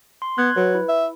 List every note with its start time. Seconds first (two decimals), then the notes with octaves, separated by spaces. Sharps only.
0.22 C6
0.38 B3 F#6 G#6
0.56 F#3 B4
0.75 E4
0.89 E5